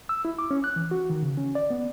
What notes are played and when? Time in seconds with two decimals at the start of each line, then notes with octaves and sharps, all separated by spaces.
0.09 E6
0.25 E4
0.39 D6
0.51 C#4
0.64 F#6
0.76 E3
0.91 F#4
1.10 D#3
1.22 C#3
1.38 C#4
1.55 D5
1.70 B3